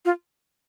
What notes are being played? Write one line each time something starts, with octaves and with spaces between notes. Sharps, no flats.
F4